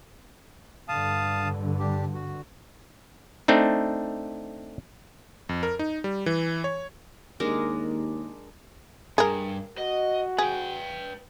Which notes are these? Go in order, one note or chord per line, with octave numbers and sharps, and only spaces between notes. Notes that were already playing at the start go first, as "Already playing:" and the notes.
G2 D3 F5 A5 D#6
D4 G4
F#4
A3 C4 D4 D#4
F2
A#4
D#4
G3
E3
C#5
D#2 G#3 D4 A#4
G2 G#4 A#4
F#4 D#5
G#4 B4 G5